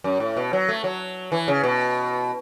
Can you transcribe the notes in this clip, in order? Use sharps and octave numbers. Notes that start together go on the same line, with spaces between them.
F#2
A2
B2
F#3
A3
F#3
E3
C#3
B2